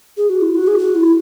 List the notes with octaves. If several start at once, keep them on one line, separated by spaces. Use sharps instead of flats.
G#4
F#4
E4
F#4
G#4
F#4
E4